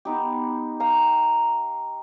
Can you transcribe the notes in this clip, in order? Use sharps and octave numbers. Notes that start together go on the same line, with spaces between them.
B3 D#4 G4
F5 G5 A#5